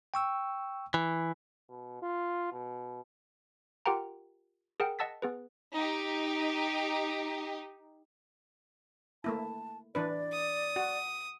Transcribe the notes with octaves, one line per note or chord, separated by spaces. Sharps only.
G5 C#6 E6
E3
B2
F4
B2
F4 G4 A#4 F#5 G5 A#5
G#4 A#4 F#5 G5
D#5 F#5 A5 E6 A6 B6
B3 G#4 B4
D#4 G4
A3 A#3 E4 A5
E3 D4 B4 D5
D#6
F#4